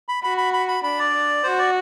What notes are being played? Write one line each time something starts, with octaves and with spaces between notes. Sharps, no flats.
B5
F#4 B5
B5
B5
B5
D4 B5
D5
F#4 C5
D5